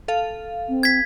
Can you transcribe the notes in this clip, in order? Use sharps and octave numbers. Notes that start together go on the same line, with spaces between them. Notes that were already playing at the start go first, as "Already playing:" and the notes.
A4 F5
C4
G#6 B6